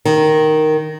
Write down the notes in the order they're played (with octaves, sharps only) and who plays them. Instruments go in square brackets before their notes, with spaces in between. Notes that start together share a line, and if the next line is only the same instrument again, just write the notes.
[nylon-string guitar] D#3